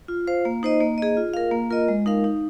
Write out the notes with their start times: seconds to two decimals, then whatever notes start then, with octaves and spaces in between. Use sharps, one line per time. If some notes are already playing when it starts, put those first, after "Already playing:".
0.08 F4
0.27 C5 F5
0.45 A#3
0.63 D#4 C5 D#5
0.80 A#3
0.98 G#4 D#5
1.17 F4
1.34 A#4 F5
1.51 A#3
1.70 F4 A#4 D#5
1.88 G#3
2.06 D#4 A#4 F5
2.24 D#4